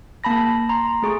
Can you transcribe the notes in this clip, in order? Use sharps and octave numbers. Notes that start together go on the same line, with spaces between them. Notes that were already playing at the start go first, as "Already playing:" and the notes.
A#3 A5 B5 A#6
A#5 C6
A3 G#4 C#6